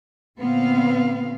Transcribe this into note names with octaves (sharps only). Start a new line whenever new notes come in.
A#2 D3 B3 C4 F5